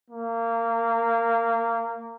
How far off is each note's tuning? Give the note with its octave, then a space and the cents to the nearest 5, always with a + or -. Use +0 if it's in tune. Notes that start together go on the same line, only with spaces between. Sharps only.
A#3 -20